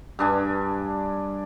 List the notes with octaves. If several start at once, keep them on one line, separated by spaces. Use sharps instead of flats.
G2 D4 G#5